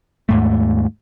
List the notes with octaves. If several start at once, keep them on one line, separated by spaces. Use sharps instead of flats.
D#2 G#2 A3